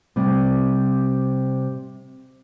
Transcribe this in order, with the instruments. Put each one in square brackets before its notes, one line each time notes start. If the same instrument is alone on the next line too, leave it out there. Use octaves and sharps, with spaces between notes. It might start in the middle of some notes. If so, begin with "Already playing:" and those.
[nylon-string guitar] C3 G3 C4